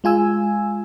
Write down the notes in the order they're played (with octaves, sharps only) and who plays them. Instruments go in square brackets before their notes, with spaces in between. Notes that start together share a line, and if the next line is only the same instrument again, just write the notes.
[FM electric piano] G#3 F4 G#5 E6